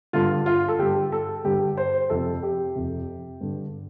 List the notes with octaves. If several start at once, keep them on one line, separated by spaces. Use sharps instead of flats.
G2 D3 F4
F4
A4
G2 D3 G4
A4
G2 D3 G4
C5
F2 C3 A4
G4
F2 C3
G2 D3